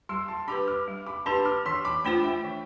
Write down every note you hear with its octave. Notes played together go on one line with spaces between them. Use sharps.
G3 C6 E6
A5 C6
D4 G4 B4 B5 D6
D6 F6
G3
B5 D6
D4 G4 B4 A5 C6
D6 F6
E3 C6 E6
B5 D6
A3 D4 F4 C5 G5 B5
E5 G5
E3